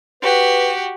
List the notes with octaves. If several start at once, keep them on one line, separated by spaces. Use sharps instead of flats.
F#4 G4 B4